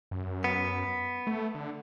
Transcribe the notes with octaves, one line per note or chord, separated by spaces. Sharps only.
F#2
B3
A3
D3